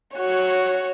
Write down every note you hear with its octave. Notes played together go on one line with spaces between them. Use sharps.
F#4 C#5